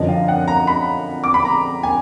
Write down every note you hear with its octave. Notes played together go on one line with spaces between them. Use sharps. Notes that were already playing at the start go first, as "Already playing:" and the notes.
Already playing: F#2 D3 F3 D#5
F5
F#5
A#5
B5
D6
B5
A#5
G#5